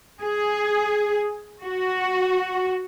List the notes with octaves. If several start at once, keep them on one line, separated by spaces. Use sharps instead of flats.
G#4
F#4